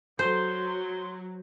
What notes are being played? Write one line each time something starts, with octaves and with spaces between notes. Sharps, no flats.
F#3 C5 C6